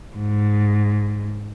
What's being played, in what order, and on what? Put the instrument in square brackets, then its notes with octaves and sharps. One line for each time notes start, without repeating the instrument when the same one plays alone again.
[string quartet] G#2